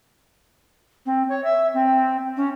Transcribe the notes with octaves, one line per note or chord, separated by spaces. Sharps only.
C4
C#5
E5
C4
C#4